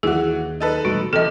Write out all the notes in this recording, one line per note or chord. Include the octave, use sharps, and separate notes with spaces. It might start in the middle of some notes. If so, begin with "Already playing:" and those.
D#2 E3 F#4 G#4
D#4 A4 B4
E1 G3 A3 F#4
A1 C3 A3 A4 D#5